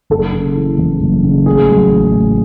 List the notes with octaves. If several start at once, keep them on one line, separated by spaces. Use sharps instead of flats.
F#1 A4
C#3
E3
E2
F#1
C#3
A1 G#4
F#3
A1
A2